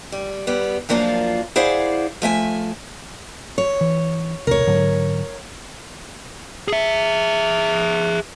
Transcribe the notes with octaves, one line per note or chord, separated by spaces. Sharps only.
G3
G3 B3
F#2 F3 A#3 D4 F4
E4 G#4 C5 D5 F5 F#5
F3 A3 E5 G#5
C#5
E3
E1 C2 A#4 C#5
G#2 D3 F#3
G#4 E5